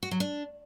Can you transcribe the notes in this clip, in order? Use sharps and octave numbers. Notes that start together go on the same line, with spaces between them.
F#4
F#3
D4